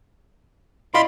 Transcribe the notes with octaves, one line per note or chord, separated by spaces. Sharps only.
E4 F4 D5 D#5 F5 B5 C6